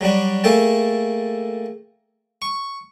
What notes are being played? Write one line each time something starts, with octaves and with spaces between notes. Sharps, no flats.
F#3 G3 D4 F#4
A3 A#3 G#4 A4 G5 A5
C#6